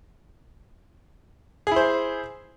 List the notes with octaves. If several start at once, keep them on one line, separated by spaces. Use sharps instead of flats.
E4 G#4 C5